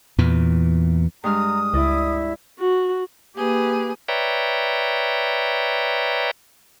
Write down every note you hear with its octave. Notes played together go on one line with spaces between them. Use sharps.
E2 A#2 E3
G2 G#3 A#5 D#6 F6
C#2 E4 D5 D#5
F#4
A#3 G4 G#4 B4
B4 C#5 D5 E5 G5 A#5